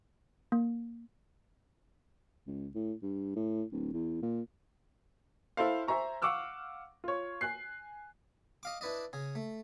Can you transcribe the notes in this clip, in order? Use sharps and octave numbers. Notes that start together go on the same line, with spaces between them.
A#3
C#2
A2
G2
A2
D1
E2
A#2
E4 A4 C5 F5
C5 E5 G#5 A#5 C#6
F5 F#5 C#6 D6 E6 F6
F4 C#5
G#5 F#6 C7
D#5 F5 D6
D4 E4 B4 D5 D#5
C#3 G#4
A3